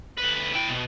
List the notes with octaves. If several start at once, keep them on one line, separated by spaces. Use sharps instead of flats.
D2 B4
E4 G5
B2